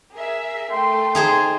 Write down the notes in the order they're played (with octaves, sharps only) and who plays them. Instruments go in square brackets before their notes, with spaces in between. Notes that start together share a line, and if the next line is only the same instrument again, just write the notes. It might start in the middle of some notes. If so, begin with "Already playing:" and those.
[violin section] G#4 A#4 E5
[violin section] A3 G5 [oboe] C6
[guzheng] D#4 G#4 C5